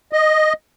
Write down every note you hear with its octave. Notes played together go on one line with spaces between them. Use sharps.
D#5